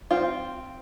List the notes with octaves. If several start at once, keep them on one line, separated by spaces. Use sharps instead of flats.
C4 F4